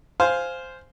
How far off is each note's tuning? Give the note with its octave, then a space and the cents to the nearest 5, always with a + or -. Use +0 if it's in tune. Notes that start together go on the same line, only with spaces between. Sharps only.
C5 -5 F5 +0 G#5 +5